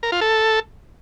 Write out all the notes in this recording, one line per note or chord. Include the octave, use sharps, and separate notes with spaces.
A#4
F4
A4